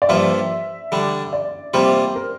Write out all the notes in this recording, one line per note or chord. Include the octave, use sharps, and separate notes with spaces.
D5
G2 F3 A#3 F4 E5
D3 G3 D4
D5
C3 G3 A#3 F4 C5
A#4